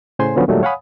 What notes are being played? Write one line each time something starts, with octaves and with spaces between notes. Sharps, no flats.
A2 C#3 C5 G#5 C6
D3 F3 F#3 B3 C#4
A#2 D#3 F#3 G3 A3
C#5 F5 F#5 G#5 B5 D#6